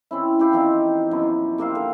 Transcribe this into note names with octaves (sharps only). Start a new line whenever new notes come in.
E3 C4 C#4 E4
E4 G4 F5
E3 F3 C4 D#4
F#2 B2 F3 E4
C3 A#3 C4 F5
D3